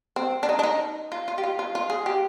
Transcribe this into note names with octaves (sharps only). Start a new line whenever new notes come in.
C4
D4
D#4
D4
D#4
F4
F4
G4
F4
F4
F4
G#4
G4